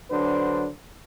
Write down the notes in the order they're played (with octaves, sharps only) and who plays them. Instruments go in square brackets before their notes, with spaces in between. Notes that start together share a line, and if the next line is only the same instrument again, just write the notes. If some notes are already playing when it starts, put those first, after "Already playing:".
[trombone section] D3 F#3 D4 B4 C5